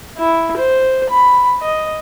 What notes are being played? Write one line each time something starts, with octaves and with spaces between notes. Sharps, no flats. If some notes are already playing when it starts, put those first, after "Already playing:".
E4
C5
B5
D#5